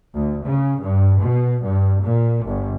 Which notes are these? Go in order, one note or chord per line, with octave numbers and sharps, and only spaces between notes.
D2
C#3
G2
B2
G2
A#2
G1